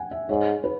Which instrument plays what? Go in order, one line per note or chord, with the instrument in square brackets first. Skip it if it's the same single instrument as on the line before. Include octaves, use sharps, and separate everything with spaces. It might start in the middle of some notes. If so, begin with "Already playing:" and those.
Already playing: [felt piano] F#5 G#5
E5
[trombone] G#2 [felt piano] C#5
[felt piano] B4